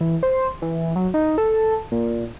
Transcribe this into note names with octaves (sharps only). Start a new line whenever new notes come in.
E3
C5
E3
F#3
D#4
A4
A#2